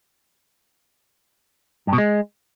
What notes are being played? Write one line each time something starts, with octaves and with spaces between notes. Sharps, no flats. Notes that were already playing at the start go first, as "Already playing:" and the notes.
G2
B2
G#3